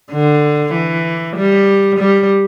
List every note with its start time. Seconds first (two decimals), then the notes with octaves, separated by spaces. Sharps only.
0.12 D3
0.73 E3
1.36 G3
1.99 G3